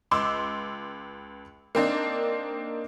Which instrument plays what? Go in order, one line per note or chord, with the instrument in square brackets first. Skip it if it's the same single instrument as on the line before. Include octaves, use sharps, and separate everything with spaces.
[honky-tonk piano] C#2 C6 D6 E6
A#3 C4 D4 D#4